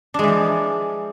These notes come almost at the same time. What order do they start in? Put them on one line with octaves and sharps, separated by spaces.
D4 G#3 E3 F3